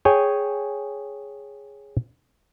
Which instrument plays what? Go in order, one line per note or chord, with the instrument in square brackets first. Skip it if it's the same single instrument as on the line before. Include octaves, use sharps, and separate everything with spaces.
[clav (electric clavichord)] G#4 C#5 G5 G#5